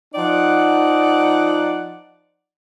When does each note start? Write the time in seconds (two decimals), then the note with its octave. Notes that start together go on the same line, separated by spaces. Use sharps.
0.15 F3 D#4 D5 F#5